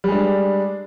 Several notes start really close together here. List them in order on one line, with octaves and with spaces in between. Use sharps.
G3 G#3 D4